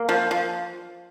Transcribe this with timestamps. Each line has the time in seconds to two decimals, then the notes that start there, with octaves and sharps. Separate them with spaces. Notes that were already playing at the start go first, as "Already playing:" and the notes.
Already playing: A#3
0.09 F3
0.31 F3